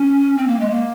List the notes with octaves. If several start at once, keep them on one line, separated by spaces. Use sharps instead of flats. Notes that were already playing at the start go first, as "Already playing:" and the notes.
Already playing: C#4
C4
A#3
G#3
A#3